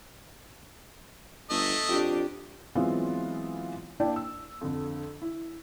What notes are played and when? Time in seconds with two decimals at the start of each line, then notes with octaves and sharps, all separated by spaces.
1.50 G1 A3 D#5
1.89 F2 D4 G4
2.75 E3 F#3 G#3 B3 C4 F4
4.00 A#3 D4 E4 D5 G5
4.16 E6
4.61 F2 D3
5.22 E4